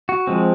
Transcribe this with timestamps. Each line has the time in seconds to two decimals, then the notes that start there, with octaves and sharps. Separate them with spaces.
0.09 F#4
0.27 F3 G#3 C4